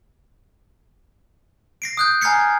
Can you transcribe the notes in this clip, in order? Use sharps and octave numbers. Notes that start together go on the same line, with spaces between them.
A#6 C7 D7
D#6 F#6 G6
G#5 A#5 F6 G#6 C7 C#7